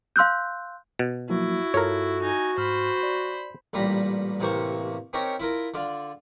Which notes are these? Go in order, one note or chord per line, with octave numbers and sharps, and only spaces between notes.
F5 C6 E6 F#6 G6
B2
F3 F#3 A#3 E4 F#4
G2 F4 A4 A#4 C#5
D#4 G#5
G#2 C5 B5 F6
D5
A1 A#2 G3 A#5 B5
A1 C3 A#3 C5 F5 C#6
C4 C#4 D#4 G4 A#4 C#5
E4 F4 A#4
D3 F4 D5 F5